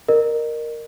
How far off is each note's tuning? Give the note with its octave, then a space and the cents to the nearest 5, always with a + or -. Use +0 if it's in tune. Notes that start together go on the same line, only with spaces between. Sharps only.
A#4 +0 D#5 -35